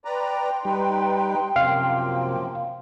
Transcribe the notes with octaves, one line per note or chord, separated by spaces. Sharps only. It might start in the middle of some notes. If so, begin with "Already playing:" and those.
B4 D5 G5 A#5 C6
G3 D#4 B4
F#2 C3 F3 A#3 F5